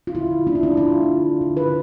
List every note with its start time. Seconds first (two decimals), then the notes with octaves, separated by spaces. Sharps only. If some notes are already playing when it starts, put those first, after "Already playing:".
0.07 F4
0.15 D3 E4
0.47 A3 D4
0.55 E4
0.63 D4
0.77 A3 F4
1.09 D3
1.41 D3
1.57 B4